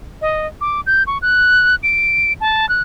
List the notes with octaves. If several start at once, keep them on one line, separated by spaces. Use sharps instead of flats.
D#5
D6
G6
C#6
F#6
D7
A5
F#6